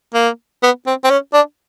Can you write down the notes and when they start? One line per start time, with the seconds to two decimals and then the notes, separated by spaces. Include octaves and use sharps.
0.14 A#3
0.63 B3
0.87 C4
1.04 C4
1.10 C#4
1.33 D4